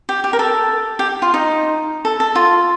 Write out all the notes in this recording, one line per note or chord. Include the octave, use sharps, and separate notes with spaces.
G4
G4
A#4
A4
G4
F4
D#4
A4
A4
F4